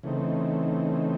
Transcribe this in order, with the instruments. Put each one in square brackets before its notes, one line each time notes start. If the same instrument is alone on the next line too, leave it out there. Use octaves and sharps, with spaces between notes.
[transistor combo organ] C#3 E3 A3 C4 D#4